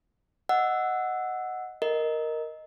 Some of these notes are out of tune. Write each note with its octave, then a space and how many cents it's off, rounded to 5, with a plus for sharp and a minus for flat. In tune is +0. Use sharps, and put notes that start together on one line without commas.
D#5 +0 F#5 +0 E6 +0
A#4 +0 D#5 +0